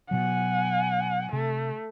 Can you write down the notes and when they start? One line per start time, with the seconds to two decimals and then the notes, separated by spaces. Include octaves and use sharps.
0.11 B2 F#3 F#5 G#5
1.33 C3 A3